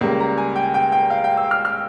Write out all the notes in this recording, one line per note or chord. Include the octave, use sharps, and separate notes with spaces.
C#2 C#3 G3 A#3
A#5
G#5
G5
G5
G5
F5
G5
E6
F6
F6